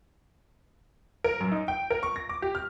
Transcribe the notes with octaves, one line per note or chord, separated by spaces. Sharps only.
A#4
F#2
D#4
G5
A#4
C#6
A#6
D6
G4
F6